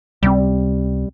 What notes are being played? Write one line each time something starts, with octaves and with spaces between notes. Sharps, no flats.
C#2 C3 F3 G3 C4